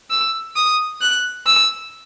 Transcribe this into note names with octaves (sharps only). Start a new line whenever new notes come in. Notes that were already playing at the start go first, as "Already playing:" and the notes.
E6
D#6
F#6
E6